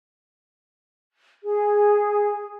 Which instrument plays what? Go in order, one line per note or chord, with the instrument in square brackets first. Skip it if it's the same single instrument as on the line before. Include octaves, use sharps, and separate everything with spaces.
[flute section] G#4